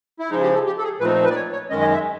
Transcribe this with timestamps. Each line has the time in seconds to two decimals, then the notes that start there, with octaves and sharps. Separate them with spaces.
0.19 E4
0.30 C#3 F3 G#3 D#4
0.42 G4
0.54 A4
0.66 G4
0.78 A4
0.84 G#4
1.00 A#2 F3 A3 C4 D#4 B4
1.24 B4
1.30 D5
1.36 C#5
1.53 C#5
1.70 F#2 D#3 G#3 C#4 D#5
1.81 D#5
1.94 E5